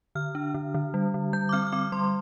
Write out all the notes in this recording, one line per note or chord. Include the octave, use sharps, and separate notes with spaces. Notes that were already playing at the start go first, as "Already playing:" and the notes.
D3 F6
D4
D3
D3
G3
D3
G3 G6
D6
C4 F6
F6
C4 D6
G3 C6